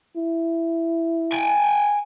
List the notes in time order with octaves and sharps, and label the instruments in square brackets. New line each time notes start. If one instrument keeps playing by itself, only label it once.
[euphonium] E4
[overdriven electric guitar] G5 G#5